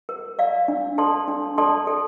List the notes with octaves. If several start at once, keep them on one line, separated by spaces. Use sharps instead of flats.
A#4
D5 F5
D4
A4 D5 A5 C6
D4
A4 D5 A5 C6
A4